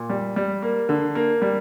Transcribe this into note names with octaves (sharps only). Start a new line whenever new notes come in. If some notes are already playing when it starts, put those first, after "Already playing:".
Already playing: A#2
G3
G3
A#3
D3
A#3
G3